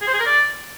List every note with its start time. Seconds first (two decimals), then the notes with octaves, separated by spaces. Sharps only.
0.01 G#4
0.07 C5
0.14 G#4
0.20 A#4
0.26 D5